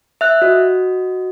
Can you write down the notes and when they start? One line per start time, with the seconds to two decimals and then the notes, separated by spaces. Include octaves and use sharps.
0.21 E5 F#6
0.42 F#4 D#5